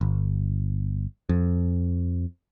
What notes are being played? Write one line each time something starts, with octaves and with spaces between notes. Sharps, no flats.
G1
F2